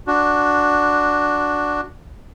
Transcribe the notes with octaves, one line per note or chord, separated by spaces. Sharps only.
D4 F#4